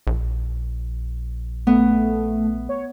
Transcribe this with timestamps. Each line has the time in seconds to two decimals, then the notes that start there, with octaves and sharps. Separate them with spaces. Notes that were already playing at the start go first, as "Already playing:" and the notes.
0.07 A#1
1.67 A3 B3
2.69 C#5